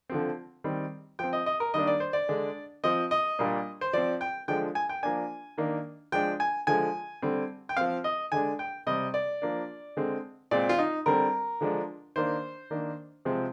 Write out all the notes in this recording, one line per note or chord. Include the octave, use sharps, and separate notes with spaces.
D3 F3 C4
D#3 G3 C4
F3 C4 G5
D#5
D#5
A#4
D#3 G3 A#3 D4 D#5
D5
C5
D5
D3 G#3 D4
F3 C4 D#5
D#5
A#2 G3 A#3 D4
C5
F3 C4 D5
G5
D3 F3 G#3 D4 G5
G#5
G5
F3 A#3 D4 G#5
D#3 A#3 D4
F3 G#3 D4 G5
G#5
D3 F3 G#3 G#5
D3 G3 C4
G5
F3 C4 F5
D#5
D3 G#3 D4 G#5
G5
C3 G3 C4 D#5
D5
F3 A#3 D4
D3 G#3 C4
A#2 G#3 C4 D5
F4
D#4
D3 G3 C4 A#4
D3 F3 G#3 D4
D#3 A#3 D4 C5
D#3 A#3 D4
C3 F3 G#3 C4